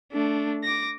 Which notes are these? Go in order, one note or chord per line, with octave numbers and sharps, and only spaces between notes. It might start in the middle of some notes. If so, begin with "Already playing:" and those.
A3 D4
D6 A#6